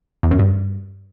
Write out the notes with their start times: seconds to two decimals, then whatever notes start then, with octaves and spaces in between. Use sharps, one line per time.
0.23 E2
0.31 F#2
0.39 G2